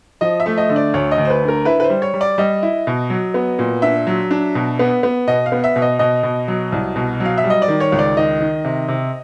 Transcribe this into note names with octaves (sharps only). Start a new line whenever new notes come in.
F3 D#5
E5
A3
D#5
D3
D5
D2 C#5
D#5
D2
C5
B4
D3
A#4
E4 B4
B4
C5
G3
C#5
G3
D5
G3 D#5
E4
B2
F#3
B3
A#2
D4 E5
F#3
D4
B2
B3
B3
B2 D#5
F5
B3
E5
B2
D#5
B2 D#5
B2
F#3
C2
B2
F#3
F5
E5
G3
D#5
D5
D#3
C#5
C#2
D5
D#3 D#5
D#3
C3
C3